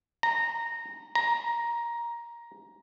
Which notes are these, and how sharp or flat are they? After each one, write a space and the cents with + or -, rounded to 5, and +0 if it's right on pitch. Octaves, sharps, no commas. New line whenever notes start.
A#5 -15
A#5 +10